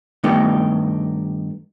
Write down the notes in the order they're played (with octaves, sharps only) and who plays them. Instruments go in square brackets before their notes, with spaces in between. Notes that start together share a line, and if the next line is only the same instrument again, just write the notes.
[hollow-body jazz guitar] G2 D#3 A3 B3 D#4 G4